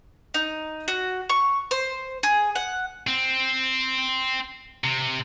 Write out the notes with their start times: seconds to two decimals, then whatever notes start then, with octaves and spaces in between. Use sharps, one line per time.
0.34 D#4
0.88 F#4
1.29 C#6
1.71 C5
2.23 G#4
2.55 F#5
3.07 C4
4.84 C3